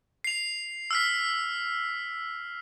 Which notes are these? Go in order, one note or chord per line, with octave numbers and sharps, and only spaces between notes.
C7 F7
E6 F6 B6